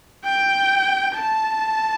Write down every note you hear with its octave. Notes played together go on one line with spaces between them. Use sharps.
G5
A5